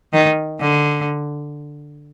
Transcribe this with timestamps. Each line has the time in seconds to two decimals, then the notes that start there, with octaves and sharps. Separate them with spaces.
0.13 D#3
0.60 D3